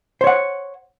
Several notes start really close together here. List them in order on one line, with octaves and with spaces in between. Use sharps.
C5 C#5 F#5